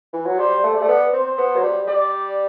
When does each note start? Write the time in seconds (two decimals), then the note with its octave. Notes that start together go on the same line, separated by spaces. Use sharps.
0.13 E3
0.26 F#3
0.39 G3 C5
0.64 A3
0.74 G3 D5
0.81 A3
0.88 B3
1.13 C4 C5
1.38 B3
1.56 F#3
1.63 G3
1.87 G3 D5